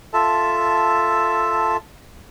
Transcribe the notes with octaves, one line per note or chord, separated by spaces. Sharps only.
F4 A4 E5 A5